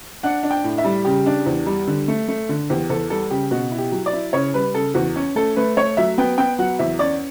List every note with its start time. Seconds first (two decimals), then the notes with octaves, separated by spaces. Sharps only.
0.23 D4 F#5
0.43 D4
0.51 G5
0.64 A2
0.78 E5
0.84 G3
1.05 C#3 G4
1.26 D4
1.46 E2
1.66 G3
1.87 D3
2.08 A3
2.28 A3
2.49 D3
2.70 E2 G4
2.90 E2 A4
3.10 G3 A4
3.31 C#3 G4
3.51 B2 F#4
3.71 E4
3.78 G4
3.92 F#3
4.06 D5
4.13 E4
4.33 C#3 C#5
4.54 G3 B4
4.74 C#3 A4
4.94 E2 F#4
5.16 C#4
5.35 A3 A4
5.56 A3 B4
5.77 A3 C#5
5.97 F#3 E5
6.18 B3 G5
6.38 B3 G5
6.59 F#3 F#5
6.79 E2 E5
6.99 C#4 D5